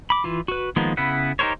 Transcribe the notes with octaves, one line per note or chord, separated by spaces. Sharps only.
B5 D6
E3 F4
F#4 B4
D#3 F3 G#3 A#3 B3
C#3 B3 E4 B4 F#5
D#4 G4 A#4 C5 C#5